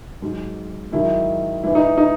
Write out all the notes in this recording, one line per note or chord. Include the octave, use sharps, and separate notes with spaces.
G#2 F#3
G#2 D#3 F#3 E4
G#2 E3 E4
D#4
D#4